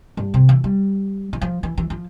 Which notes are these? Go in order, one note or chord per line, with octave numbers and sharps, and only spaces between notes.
G2
C3
E3
G3
E3
F3
E3
E3
F3